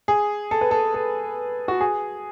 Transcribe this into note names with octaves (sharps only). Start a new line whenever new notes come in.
G#4
A4
B4
A4
A4
F#4
G#4